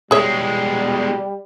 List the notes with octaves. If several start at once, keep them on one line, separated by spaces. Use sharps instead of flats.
B2 G3 G#3 G#4 C#5 E5